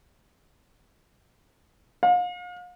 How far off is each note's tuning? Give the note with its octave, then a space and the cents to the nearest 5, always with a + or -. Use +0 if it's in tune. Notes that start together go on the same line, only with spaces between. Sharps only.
F5 +40